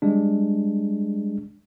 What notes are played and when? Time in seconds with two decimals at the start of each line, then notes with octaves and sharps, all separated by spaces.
0.02 G3 G#3 D4